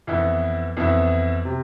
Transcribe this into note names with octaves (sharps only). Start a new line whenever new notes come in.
F2 E3 B3 E4
F2 E3 B3 E4
C3